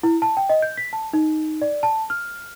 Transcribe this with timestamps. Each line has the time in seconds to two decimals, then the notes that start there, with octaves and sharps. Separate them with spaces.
0.03 E4
0.22 A5
0.37 G5
0.49 D#5
0.62 G6
0.77 B6
0.93 A5
1.13 D#4
1.61 D5
1.83 A5
2.10 F6